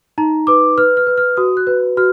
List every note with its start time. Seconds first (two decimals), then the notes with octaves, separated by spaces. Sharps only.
0.18 D#4 A#5
0.47 B4 D6
0.78 B4 F6
0.97 F6
1.07 B4
1.18 F6
1.37 F#4 D#6
1.57 F#6
1.67 B4
1.97 F#4 F6